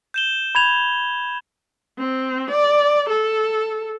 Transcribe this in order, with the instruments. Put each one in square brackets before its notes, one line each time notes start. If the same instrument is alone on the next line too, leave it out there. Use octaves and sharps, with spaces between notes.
[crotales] G6 E7 G7
[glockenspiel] B5 G#6 F7
[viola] C4
D5
A4